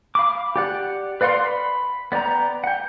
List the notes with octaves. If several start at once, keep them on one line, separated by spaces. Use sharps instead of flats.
F5 B5 D6
G4 D5 F#5
B4 D5 F5 F#5 C6
B5
B3 D5 G5 A#5
F#5 G5